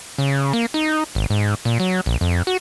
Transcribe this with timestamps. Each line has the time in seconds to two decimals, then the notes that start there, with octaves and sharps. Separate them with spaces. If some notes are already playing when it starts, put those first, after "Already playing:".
0.18 C#3
0.53 A#3
0.74 D#4
1.15 G#1
1.30 G#2
1.65 A#2
1.80 F#3
2.06 A#1
2.21 F2
2.47 F#4